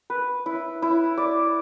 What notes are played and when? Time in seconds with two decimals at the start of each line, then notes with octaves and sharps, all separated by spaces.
0.10 B4
0.46 E4
0.82 E4
1.18 D5